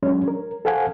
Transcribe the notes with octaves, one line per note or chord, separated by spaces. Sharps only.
F#3 G#3 C#4 D4 C#5
A#4
A4 C5 F5 F#5 G#5